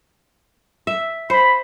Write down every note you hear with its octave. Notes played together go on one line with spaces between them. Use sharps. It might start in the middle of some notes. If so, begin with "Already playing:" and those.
E5
C5 B5